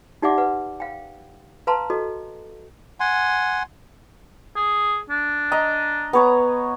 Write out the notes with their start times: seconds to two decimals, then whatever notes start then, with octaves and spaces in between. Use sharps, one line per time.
0.22 D#4 G4 D5 E5 F#5 D6
0.38 B4 F#5
0.80 F5 G5
1.67 B4 F5 A5 A#5 C6
1.90 F#4 A4 D#5
3.00 F#5 G#5 C6
4.56 G#4
5.10 D4
5.52 D#5 A#5
6.13 B3 C#5 A#5